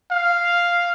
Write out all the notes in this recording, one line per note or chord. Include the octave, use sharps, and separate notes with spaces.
F5